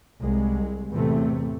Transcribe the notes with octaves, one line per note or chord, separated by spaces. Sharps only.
C2 G#3
E2 A2 C3 A3